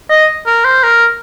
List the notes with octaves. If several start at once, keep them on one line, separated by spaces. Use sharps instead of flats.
D#5
A#4
C5
A#4